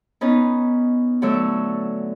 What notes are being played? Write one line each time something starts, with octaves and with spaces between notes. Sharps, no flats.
B3 C#4 D#4 B4
D3 F#3 A3 D4 C#5 E5